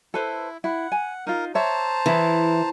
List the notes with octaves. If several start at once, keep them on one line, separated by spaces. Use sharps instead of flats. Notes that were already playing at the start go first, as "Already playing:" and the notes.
E4 A4 B4 C5
E4 F#5
G#5
D#4 F4 A#4
C5 C#5 E5 A5 A#5
E3 E4 G#4